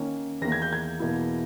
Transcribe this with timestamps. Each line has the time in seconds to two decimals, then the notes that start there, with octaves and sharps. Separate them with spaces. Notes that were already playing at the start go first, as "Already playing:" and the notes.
Already playing: D#3 A#3 C#4
0.41 E2 D#3 A#3 A#6
0.52 G#6
0.62 G6
0.73 G#6
1.00 E2 B2 A#3 E4